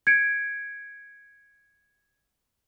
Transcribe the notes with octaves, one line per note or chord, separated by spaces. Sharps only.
G#6 C#7 D7